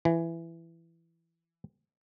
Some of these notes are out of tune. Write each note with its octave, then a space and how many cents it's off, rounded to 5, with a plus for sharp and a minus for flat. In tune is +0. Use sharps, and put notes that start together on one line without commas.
E3 +15